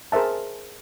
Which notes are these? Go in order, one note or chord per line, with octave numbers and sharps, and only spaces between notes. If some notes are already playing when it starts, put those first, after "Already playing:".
G#4 A#4 C5 E5 A5